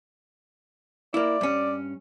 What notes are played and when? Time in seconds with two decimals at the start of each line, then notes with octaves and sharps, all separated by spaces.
1.14 A#3 E4 D5
1.41 G2 C#4